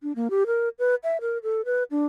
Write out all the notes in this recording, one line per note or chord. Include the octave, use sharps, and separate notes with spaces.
D4
A#3
G4
A#4
B4
E5
A#4
A4
B4
D4